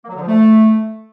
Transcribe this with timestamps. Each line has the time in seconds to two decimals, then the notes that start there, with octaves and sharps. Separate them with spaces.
0.03 A#3
0.09 F#3
0.15 D3
0.21 F3
0.27 A3